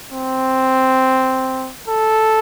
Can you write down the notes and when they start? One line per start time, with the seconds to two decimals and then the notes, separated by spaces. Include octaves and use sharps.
0.12 C4
1.88 A4